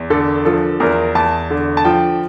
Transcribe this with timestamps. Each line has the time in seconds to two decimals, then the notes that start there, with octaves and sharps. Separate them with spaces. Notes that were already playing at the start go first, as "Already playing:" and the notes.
Already playing: E2
0.10 D3 A4
0.45 F3 A4
0.80 E2 A#4
1.15 E2 A5
1.50 D3
1.77 A5
1.85 F3 G5